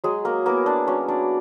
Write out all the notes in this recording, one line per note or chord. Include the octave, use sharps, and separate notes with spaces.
F#3 G#3 G#4
A#3 A#4
A#3 B3 E4 A#4
D4 D5
F#3 C#4 C#5
D4 D5